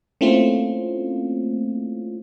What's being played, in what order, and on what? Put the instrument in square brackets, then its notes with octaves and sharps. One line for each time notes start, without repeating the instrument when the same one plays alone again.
[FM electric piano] A3 A#3 C4 C#4 E4 F4